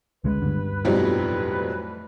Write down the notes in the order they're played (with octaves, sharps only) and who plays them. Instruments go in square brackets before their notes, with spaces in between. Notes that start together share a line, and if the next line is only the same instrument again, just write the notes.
[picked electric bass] D2 C#3 G#3 [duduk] B4
[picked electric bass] G2 D3
[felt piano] B1 F2 A2 [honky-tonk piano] F#3 G3 C4 [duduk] B4